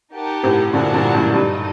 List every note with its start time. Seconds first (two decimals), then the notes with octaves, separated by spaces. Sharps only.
0.14 D#4 G4 A#4 F#5 A5
0.43 A2 C3
0.73 A#2 D3 D4 F#4 A#4 F#5 A5
0.94 G2 A#2
1.14 F#2 A2
1.34 G2 D#4 A4 D#5